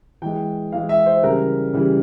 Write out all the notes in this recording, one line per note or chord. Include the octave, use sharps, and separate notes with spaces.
E3 G#3 G5
E3 G#3 F5
E5
C5
C#3 E3 G3 A#4
C#3 E3 G3